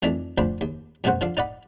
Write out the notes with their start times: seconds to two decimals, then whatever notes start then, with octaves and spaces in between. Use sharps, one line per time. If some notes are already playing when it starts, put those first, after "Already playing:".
0.03 F2 D#3 E3 A3 D4
0.38 D2 F3 D4 C5 B5
0.61 D#2
1.04 F#2 B2 A3 F#4 C5 F#5
1.21 D3 F3 D4 F5
1.37 D#4 D5 F#5 B5